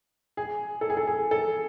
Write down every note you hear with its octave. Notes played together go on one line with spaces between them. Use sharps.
G#4
A4
G#4
A4
G#4
A4